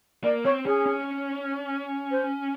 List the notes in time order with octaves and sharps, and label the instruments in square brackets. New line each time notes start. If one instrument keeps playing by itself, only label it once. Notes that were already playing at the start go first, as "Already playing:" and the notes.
[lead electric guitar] A#3 [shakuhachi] D5
[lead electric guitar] C4 [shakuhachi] C#5
[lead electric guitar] C#4 [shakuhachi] G#4
[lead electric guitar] C#4
[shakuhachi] C5